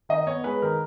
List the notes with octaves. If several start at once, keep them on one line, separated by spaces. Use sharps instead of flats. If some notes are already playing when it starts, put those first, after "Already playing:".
D#3 D#5
B3 C#5
G#3 B4
D#3 A#4